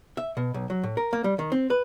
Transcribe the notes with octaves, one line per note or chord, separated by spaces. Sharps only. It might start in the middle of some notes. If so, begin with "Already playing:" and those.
E5
B2
B1
F#3
A2
A#4
A#3
G3
D#3
C4
B4